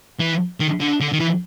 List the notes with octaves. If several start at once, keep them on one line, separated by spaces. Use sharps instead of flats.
E3
D#3
D3
D3
D#3
E3